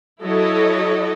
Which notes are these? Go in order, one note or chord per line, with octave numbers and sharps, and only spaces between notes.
F#3 E4 F#4 A4 C#5 D#5